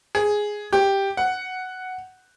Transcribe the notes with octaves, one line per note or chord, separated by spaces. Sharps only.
G#4
G4
F#5